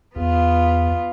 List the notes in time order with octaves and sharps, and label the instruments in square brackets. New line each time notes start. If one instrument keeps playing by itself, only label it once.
[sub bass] E2 [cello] B3 F4